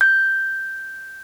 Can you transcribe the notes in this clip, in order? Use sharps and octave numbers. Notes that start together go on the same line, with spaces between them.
G6